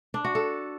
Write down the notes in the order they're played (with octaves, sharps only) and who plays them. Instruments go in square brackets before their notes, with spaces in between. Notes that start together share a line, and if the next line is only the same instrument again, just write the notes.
[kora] D4
F#4
A4